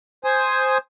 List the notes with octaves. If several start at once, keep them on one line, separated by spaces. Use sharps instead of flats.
C5 G#5 D#6